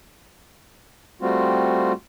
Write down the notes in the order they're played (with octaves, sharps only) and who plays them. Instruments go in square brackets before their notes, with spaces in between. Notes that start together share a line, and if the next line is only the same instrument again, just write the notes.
[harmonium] G3 A3 C4 F4 F#4